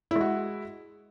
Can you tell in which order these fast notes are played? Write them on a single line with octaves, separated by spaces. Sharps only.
E4 G#3 F#4